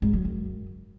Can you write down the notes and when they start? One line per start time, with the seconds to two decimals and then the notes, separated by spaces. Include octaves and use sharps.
0.02 G#2
0.13 F#3
0.25 F#2